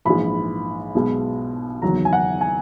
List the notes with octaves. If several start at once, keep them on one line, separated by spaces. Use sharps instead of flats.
A#1 G#2 E3 G#3 B5
B1 B2 G#3
F#1 E2 D#3 F#3 A#5
G#5
F#5
G#5